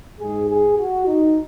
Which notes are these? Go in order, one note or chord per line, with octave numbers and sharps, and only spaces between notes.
G#2 G#3 G#4
G#4
F#4
D#4